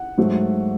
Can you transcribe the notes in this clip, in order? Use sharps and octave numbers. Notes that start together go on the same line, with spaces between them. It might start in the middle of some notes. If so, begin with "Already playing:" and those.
Already playing: F#5
G#2 F#3 A3